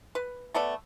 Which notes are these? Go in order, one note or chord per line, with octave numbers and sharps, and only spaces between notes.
B4
A3 B3 A4 D5